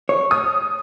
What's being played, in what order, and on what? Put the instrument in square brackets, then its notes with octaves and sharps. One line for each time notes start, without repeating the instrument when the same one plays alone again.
[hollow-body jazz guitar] C#5
[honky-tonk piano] D#6